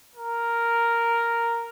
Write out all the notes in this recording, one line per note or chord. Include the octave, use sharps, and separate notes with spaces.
A#4